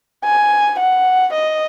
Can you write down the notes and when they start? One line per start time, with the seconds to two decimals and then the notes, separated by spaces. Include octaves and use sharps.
0.25 G#5
0.79 F#5
1.34 D#5